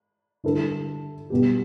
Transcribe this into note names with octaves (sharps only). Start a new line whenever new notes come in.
D3 G3 E4 A4
B2 G3 B3 G4